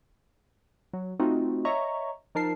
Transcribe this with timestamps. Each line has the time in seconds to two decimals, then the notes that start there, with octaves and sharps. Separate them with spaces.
0.93 F#3
1.20 A3 C4 D#4 F4 F#4
1.65 C#5 D#5 E5 A#5 C#6
2.35 F3 D#4 A#4 A5 C7